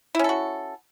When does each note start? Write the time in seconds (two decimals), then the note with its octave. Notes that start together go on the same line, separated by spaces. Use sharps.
0.15 E4
0.19 C#4
0.24 A4
0.29 F#4